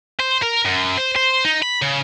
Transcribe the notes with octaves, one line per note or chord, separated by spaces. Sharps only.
C5
A#4
F#2
C5
C5
D#4
B5
C#3